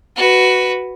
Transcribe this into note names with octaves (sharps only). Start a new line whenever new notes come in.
F#4 B4